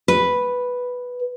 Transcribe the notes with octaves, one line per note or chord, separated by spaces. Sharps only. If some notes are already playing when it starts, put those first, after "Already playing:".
B4